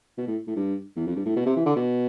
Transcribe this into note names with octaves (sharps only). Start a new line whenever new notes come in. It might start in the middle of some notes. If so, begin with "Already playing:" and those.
B2
A2
A2
G2
E2
F2
G2
A2
B2
C3
E3
D3
B2